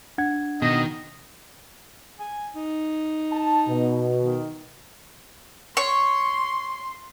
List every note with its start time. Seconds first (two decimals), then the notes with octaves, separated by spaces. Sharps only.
0.18 D4 F#5 G#6
0.62 B2 D#3 D#5
2.19 G#5
2.55 D#4
3.32 A5
3.68 B2
4.22 D#3
5.77 C#5 C6